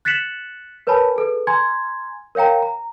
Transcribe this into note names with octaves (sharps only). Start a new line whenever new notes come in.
F#6 A6 B6 C#7 E7 F#7
A#4 B4 C#5 G#5 A5 B5
G#4 A4 B4
G#5 A#5 C6 G#6
A#4 C#5 F5 G5 A#5
A#5